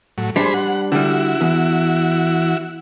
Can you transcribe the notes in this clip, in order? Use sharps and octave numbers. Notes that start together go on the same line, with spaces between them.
A2 F#3
G3 D4 G#4 C5 B5
F#5
D3 G3 E4 F#4
E2